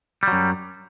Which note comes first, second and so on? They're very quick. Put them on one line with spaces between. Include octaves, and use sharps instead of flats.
G3 F#3 F#2